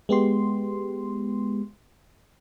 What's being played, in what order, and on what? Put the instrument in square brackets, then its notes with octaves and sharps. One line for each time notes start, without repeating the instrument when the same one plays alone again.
[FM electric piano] G#3 B3 G4 C6